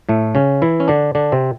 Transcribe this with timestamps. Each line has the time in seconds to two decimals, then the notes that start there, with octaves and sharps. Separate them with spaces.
0.09 A2 A3
0.35 C#3 C#4
0.62 E3 E4
0.80 C#4
0.88 D3 D4
1.15 D3 D4
1.32 C3 C4